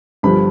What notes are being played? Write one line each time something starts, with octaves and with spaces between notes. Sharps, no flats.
G1 G2 F3 B5